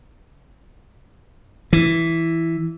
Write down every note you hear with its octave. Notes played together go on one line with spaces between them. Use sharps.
E3